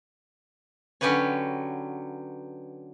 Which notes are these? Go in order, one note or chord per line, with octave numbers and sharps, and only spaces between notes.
D3 F#3 C#4 G4 B4 C#5